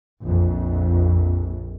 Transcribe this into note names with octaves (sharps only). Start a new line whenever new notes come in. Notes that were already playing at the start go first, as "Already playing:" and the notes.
A#1 F2